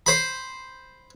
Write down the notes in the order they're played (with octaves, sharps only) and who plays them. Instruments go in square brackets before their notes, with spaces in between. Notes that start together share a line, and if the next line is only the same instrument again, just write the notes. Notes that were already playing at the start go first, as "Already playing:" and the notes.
[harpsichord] C5 B5